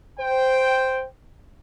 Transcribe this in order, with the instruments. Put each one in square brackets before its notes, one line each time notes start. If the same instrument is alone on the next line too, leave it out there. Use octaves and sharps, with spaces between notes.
[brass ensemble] C5 G5